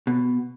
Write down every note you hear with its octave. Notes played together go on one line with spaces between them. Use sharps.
B2